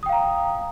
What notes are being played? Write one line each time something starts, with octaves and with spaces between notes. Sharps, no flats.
F5 G5 A#5 D#6